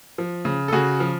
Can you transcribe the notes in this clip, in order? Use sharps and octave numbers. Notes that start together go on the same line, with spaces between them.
F3
C#3
A4
C#3 F#4 G#4
F3